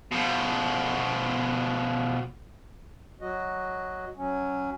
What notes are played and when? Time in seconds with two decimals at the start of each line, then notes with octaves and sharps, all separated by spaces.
0.11 B2 F3
3.21 F#3 F#4 D#5
4.17 F#3 C#4